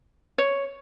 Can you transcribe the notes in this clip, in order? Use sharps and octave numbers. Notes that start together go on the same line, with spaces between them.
C#5